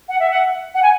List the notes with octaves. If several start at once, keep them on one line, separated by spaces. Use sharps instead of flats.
F#5
E5
F#5
F#5
G#5